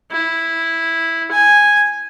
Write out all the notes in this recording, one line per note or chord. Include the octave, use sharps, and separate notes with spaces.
E4
G#5